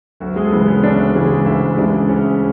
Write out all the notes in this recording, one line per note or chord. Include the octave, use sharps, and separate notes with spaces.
D2 F#3 F#4
G#3 G#4
A4
C#3 E3 G#3 B3 B4
C#4 C#5
D2 D4 D5
C#3 E3 G#3
D2 E4 E5
C#3 E3 G#3 D4 D5
D2 C#4 C#5